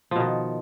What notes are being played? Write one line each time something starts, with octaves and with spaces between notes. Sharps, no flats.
B2 D#3 F3